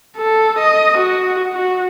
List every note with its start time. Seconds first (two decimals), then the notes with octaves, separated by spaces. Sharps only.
0.17 A4
0.58 D#5
0.98 F#4
1.54 F#4